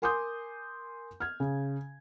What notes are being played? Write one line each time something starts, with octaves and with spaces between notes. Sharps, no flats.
A#4 G#5 C6 D6 D#6 G6
F6 G#6
C#3